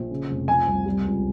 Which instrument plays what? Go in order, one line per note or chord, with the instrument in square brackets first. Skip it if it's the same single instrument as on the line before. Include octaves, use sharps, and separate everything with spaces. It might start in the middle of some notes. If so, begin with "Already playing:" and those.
Already playing: [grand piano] A#1
C#3
F1
F3 G#5
C2
G3
C#2